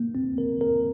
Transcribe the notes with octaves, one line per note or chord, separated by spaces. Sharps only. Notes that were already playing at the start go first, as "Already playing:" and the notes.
Already playing: A#3
C4
A#4
A#4